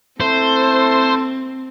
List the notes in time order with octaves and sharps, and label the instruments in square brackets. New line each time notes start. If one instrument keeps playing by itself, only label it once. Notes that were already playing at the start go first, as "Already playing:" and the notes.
[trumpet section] A3 E4 A4 [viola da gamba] C4 [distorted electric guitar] C5